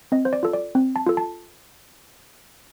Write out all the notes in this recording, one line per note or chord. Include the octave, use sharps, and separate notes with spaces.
C4 D#5
C5
D5
F4 A4
D5
C4
A5
F4 A4
A5